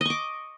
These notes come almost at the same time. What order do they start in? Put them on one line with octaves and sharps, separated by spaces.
D#5 C#6 D6